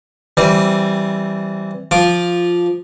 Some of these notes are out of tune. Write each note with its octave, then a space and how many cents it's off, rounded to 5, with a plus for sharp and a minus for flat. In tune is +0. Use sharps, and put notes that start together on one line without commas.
E3 +0 G3 -15 C4 +0
F3 +0 F4 +5 D6 +0